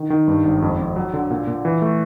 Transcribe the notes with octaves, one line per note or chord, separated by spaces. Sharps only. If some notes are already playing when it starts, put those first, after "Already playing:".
Already playing: D#3
D#3
G2
G#1
F2
F2
F#3
D3
A#2
A#2
E3
A3